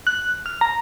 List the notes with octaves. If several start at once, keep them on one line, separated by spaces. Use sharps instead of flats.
F#6
F6
A#5